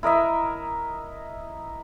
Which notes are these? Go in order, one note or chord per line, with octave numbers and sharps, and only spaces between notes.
E4 A#4 D#5 E5